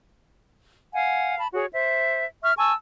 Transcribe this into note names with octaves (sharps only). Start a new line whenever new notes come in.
F5 F#5 G#5
A5 B5
F#4 G#4 C#5
C5 E5
E5 C#6 F6
G#5 A5 C#6 E6